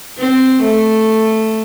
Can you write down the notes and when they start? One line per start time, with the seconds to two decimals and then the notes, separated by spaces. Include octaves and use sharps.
0.18 C4
0.62 A3